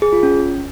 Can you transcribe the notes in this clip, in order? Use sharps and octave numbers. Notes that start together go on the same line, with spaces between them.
G#4
F4
C#4